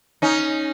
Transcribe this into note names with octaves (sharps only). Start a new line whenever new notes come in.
C#4 D#4